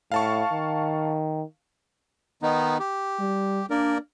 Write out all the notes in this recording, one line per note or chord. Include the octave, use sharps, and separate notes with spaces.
A2 F5 A5 C#6
D#3
D#3 B3 D#4
G4
G3
A#3 D4 A#4 D5